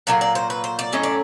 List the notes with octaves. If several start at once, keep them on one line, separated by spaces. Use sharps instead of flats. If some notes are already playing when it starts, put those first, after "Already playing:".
A#2 F#3 A#3 D5
D5
C5
B4
C5
D5
A2 F#3 A3 C#4 D#5
D5